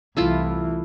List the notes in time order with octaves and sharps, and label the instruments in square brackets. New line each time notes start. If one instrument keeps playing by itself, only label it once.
[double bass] C2 E3 [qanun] A3 E4 F4